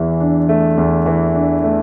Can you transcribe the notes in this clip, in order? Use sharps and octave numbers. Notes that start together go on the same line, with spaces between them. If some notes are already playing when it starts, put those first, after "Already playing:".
Already playing: E2 E3
D4
A3
E2
E3
D4
A3